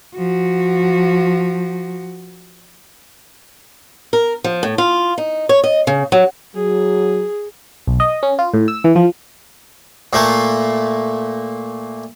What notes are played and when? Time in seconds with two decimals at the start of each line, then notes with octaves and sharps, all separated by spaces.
0.16 F3 F#4
4.13 A#4
4.44 F3
4.63 A2
4.78 F4
5.18 D#4
5.49 C#5
5.64 D#5
5.87 C#3
6.12 F#3
6.55 F#3 G#4
7.87 B1
8.00 D#5
8.23 C#4
8.39 F4
8.54 A2
8.68 E6
8.84 E3
8.96 F3
10.13 A#2 A3 A#3